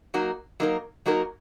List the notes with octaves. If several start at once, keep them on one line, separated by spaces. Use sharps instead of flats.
F#3 A#3 D#4 F#4 A#4
F#3 A#3 D#4 F#4 A#4
F#3 A#3 D#4 F#4 A#4